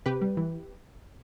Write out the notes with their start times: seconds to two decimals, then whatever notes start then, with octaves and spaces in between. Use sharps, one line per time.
0.06 C3 G4 B4
0.22 G3
0.37 E3